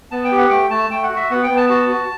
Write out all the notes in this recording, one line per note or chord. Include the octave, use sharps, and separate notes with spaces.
B3 A5
G5
G4
F#5
A3 G5
A3 A5
A3 G5
F#5
F#4
E5
B3 F#5
G5
B3
A5
F#4 A5
F#4